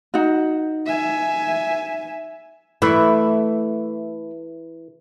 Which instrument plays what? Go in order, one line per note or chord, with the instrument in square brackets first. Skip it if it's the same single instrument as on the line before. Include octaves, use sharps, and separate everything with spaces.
[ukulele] D#4 F#4
[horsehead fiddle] E5 G#5
[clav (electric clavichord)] E3 [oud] A3 E4